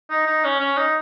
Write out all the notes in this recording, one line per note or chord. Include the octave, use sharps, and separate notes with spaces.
D#4
D#4
C#4
C#4
D#4